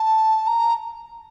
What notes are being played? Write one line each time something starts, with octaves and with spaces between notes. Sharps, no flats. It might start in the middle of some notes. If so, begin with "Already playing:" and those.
Already playing: A5
A#5